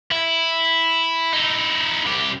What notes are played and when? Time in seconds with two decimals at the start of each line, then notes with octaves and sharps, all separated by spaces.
0.11 E4
1.33 D#4 E4
2.07 C2 G4